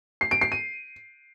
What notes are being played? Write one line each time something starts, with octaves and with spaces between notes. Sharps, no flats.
C7
D7
C7
D#7